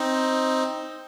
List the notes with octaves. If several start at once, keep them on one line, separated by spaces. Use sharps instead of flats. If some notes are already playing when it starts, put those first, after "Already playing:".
Already playing: C4 D#4